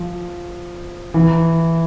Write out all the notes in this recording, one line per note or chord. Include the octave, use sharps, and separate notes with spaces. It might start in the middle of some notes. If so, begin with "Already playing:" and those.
Already playing: F3
E3